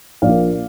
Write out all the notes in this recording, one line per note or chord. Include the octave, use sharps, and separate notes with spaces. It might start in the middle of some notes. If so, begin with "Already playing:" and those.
A#1 A#2 F3 D5 F5